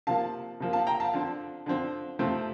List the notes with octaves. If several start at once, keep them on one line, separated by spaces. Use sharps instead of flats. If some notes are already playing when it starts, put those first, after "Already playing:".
C3 F3 A#3 F5 A5
C3 F3 A#3
F5 A5
G5 A#5
F5 A5
D3 F3 C4
D3 F3 C4
C3 F3 A3 C4